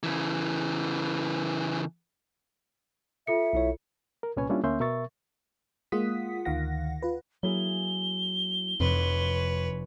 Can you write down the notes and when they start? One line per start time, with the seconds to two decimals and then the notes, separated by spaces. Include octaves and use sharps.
0.03 C#3 E3
3.27 F4 A4 E5 C#7
3.53 B1 E4 C#5
4.23 A#4
4.37 C2 A#2 C#4 B4 C#5 G#5
4.49 G3 A#3 C#4 D4 E4 F4
4.64 D2 A#3 C#4 E5 C6 G6
4.80 B2 A#4 E5 C#6 A6
5.92 G#3 A#3 F4 F#5 D#6 B6
6.45 D2 D#3 F5 F#5 A#6
7.03 F4 B4
7.43 F#3 A#3 E4 G#4 G7
8.80 F1 F2 B4 C#5 C6